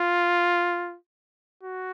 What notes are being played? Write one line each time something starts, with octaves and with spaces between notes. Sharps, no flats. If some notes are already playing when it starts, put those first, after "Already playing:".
Already playing: F4
F#4